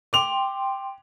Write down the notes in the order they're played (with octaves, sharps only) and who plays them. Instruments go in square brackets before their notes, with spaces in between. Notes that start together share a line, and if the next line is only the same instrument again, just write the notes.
[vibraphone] G5 C6 [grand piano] D6 F7